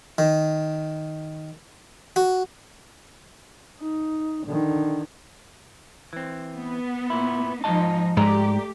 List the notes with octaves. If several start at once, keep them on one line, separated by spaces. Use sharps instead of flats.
D#3
F#4
D#4
D3 D#3
E3 C4
B3
A#2 E4
G#2 F3 D#4 D#5 A5
G#2 G#3 A3 G4 D5 A#5